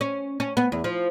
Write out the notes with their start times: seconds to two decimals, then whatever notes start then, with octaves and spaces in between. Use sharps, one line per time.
0.01 C#4
0.40 C#4
0.57 B3
0.72 E2
0.84 F3